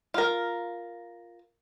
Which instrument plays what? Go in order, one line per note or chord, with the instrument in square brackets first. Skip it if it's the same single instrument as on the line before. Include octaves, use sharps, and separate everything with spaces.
[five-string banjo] F4 A#4